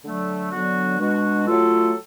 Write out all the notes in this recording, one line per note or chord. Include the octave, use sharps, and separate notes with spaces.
D3 F#3 A3
D3 F#3 B3 F#4
B2 G#3 D4 F#4
F#3 A3 F4 A4